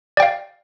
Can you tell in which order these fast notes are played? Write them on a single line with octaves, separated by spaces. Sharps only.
D5 G5 F5